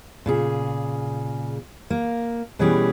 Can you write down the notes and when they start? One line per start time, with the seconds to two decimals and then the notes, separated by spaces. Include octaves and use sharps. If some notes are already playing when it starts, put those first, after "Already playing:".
0.26 A#2 C#3 G#4
1.90 A#3
2.59 B2 E3 G3 C#4 G4 G#4